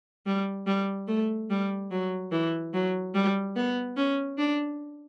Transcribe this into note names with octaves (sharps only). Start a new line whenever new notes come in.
G3
G3
A3
G3
F#3
E3
F#3
G3
B3
C#4
D4